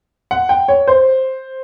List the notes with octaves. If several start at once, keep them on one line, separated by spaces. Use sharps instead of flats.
F#5
G5
C#5
C5